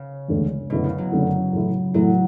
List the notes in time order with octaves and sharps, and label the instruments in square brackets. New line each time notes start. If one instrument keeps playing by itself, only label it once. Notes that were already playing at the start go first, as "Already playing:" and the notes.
Already playing: [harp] C#3
[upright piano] E1 D2 D3 A3
[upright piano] F#1 F#2 D3 A3 E4 [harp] B2
[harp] C#3
F#3
[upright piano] F#1 F#2 D3 A3 E4
A2 E3 A3 E4
[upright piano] A2 E3 A3 E4 [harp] F#3